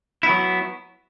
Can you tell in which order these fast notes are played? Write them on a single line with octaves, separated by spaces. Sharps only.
E4 B3 F#3